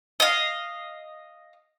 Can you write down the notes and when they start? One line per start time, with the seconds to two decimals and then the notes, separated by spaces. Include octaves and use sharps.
0.20 D#5 F5